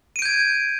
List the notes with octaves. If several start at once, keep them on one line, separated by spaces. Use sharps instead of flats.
G6 G#6 D7 D#7